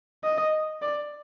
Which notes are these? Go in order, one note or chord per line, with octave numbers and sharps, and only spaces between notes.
D#5
D5